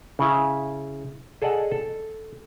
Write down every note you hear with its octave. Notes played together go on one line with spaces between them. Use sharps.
C#3 E4
G#4 A4 D5 D#5 F#5
A4